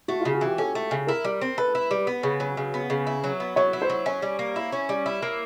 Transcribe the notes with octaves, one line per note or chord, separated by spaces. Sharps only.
A3 F#4
C#3 F4
F#4
E3 G4
C#4 A4
A3
C#3
E4 A#4
G3
C4
A4 B4
E4
G3
B3
C#3
F#3
C#3
B3
C#3
E4
F#3
B3
F#3 C#5
E4
C5
F#3
C#4 C#5
G3
A#3
E4
C#4
G3
E4
A#3